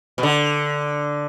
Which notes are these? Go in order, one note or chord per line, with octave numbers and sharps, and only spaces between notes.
B2
D3